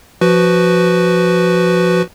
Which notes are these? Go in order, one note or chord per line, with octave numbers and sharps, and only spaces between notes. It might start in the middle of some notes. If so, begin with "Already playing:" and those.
F3 F#4 B4